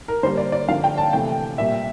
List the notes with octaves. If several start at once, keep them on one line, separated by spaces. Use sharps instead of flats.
A#4
D3 G3 A#3 C5
D5
D5
D3 F3 A#3 F5
G5
A5
C3 E3 A3 G5
A#2 G3 A#3 E5